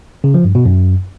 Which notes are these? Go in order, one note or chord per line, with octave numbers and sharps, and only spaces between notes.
C#3
F3
G2
B2
F#2